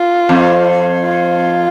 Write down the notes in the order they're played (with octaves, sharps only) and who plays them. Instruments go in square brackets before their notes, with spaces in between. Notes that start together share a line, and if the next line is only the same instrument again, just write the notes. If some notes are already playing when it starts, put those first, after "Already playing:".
Already playing: [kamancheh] F4
[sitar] F2
[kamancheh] F4